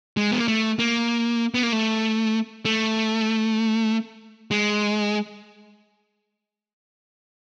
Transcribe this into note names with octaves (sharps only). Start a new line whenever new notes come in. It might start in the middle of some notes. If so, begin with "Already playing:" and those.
G#3
B3
A#3
A3
A#3
B3
A#3
A3
A3
G#3